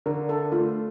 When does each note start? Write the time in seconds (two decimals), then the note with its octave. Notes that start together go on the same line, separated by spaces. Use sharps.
0.06 D3 A#4
0.29 A4
0.52 A3 F4